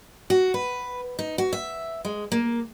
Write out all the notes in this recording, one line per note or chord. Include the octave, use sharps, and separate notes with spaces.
F#4
B4
D#4
F#4
E5
G#3
A#3